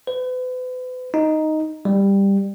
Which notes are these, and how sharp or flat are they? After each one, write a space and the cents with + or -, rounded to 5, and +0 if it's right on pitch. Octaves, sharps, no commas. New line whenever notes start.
B4 +40
D#4 +0
G3 +10